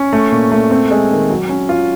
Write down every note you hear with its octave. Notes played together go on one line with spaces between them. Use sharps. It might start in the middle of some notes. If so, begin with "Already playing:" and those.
Already playing: C#4
A3
A#2
A3
C4
G#3
D#3
F#3
C#4
F4